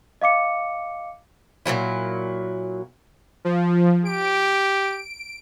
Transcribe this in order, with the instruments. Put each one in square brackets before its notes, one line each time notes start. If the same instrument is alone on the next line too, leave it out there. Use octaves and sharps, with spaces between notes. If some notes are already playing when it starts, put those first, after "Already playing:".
[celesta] D#5 F5 D6 C#7
[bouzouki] A#2 D#3 F#3 E4
[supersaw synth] F3
[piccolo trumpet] G4 [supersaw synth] D7